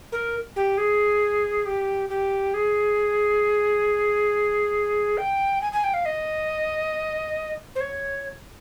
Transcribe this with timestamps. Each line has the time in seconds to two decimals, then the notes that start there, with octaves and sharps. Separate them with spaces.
0.12 A#4
0.56 G4
0.77 G#4
1.66 G4
2.09 G4
2.54 G#4
5.17 G5
5.61 G#5
5.72 G#5
5.84 G5
5.93 F5
6.05 D#5
7.75 C5
7.80 C#5